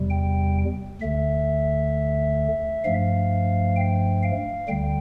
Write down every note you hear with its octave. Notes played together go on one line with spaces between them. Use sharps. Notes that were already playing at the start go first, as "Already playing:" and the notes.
Already playing: E2 C3 G3
G5
D2 D3 A3 E5
G2 F3 A3 F5
G5
F5
D2 D3 G3 G5